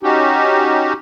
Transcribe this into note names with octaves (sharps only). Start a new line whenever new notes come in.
C#4 D#4 F#4 G4